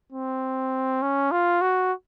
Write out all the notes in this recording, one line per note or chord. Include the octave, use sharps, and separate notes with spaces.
C4
C#4
F4
F#4